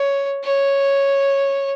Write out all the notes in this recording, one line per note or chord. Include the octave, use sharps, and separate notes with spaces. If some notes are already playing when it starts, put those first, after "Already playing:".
Already playing: C#5
C#5